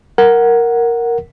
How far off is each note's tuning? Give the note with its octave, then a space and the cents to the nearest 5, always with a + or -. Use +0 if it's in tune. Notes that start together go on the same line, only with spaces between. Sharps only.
A#4 +0 F#5 +0